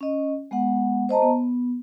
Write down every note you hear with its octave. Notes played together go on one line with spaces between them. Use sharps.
C#4 D#5
G#3 B3 F#5
C5 D#5 A5 A#5
B3